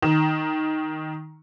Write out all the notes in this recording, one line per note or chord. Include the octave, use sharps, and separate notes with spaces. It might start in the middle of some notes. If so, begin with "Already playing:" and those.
D#3